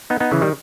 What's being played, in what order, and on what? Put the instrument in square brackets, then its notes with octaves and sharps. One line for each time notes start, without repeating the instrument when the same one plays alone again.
[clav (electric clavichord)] B3 D#4
B3 D#4
C#3 E3
D#3 G3